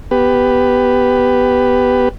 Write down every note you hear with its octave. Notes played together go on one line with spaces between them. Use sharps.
B3 G4 B4